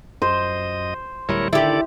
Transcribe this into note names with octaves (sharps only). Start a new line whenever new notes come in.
F#2 C5 D#5
D1 G3 E4 A#4 C#5
D3 D#3 E4 G4 A4 D5